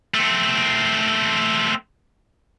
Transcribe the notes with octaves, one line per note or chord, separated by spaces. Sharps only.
A3 C4